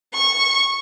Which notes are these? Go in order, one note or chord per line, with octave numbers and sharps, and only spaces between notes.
C#6